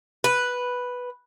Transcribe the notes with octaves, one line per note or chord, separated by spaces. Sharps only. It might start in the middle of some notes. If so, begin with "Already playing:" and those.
B4